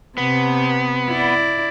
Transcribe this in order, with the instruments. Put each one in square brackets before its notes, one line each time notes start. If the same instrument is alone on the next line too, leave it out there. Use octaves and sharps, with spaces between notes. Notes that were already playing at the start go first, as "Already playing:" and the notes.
[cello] C3 [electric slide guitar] B3
[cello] E4 D5